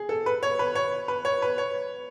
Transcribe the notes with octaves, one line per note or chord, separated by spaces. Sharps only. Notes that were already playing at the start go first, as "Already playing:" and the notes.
Already playing: G#4
A4
B4
C#5
B4
C#5
B4
C#5
B4
C#5